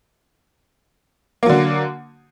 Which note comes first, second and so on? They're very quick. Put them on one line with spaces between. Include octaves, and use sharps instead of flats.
A#3 F#3 D3